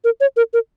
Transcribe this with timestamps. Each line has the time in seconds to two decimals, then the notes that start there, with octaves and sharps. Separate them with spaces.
0.04 A#4
0.20 C#5
0.37 A#4
0.53 A#4